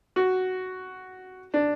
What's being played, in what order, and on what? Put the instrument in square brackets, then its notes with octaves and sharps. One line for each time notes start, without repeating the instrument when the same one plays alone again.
[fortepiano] F#4
D4